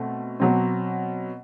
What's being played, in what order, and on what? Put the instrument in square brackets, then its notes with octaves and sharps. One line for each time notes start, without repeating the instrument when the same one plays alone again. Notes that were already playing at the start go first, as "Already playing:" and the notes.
Already playing: [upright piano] B2 A3 C4
B2 F#3 C4